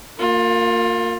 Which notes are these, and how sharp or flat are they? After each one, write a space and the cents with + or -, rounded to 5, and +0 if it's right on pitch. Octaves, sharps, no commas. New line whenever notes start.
A#3 -20 F4 +25